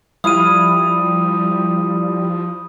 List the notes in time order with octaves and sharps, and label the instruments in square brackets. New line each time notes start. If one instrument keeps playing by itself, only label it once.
[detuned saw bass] F3 [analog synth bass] G3 [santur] E4 F5 [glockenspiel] D#6 D#7